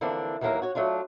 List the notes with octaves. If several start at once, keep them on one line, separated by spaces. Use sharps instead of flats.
D3 E3 F3 A#3 C4 D4
D#2 E3 F#3 A#3 E4 A#4
F#4 C#5
F#3 A3 D4 F4